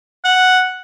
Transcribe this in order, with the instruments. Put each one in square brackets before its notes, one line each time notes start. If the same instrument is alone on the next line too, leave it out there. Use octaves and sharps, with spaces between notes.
[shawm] F#5